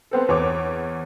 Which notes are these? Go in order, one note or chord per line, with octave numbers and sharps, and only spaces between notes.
B3 C4 A4
E2 C#5 D6